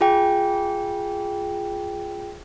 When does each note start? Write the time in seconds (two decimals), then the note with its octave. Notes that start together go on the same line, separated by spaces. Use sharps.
0.01 F4 G#4 G5